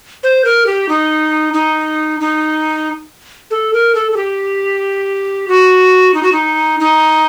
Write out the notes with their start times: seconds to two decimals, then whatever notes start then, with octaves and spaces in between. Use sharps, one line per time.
0.23 C5
0.44 A#4
0.66 G4
0.89 D#4
1.53 D#4
2.20 D#4
3.50 A4
3.73 A#4
3.95 A4
4.12 A4
4.16 G4
5.48 F#4
6.14 D#4
6.23 F#4
6.32 D#4
6.80 D#4